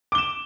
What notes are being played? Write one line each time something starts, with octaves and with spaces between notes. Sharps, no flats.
D6 E7 G7